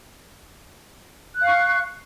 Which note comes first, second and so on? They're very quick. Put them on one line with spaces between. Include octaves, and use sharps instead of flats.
F#6 F5 C#6